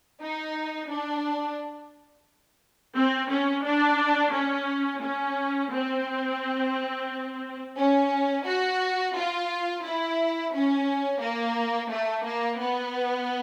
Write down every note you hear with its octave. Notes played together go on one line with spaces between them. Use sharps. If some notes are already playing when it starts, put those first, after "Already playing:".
D#4
D4
C4
C#4
D4
C#4
C#4
C4
C#4
F#4
F4
E4
C#4
A#3
A3
A#3
B3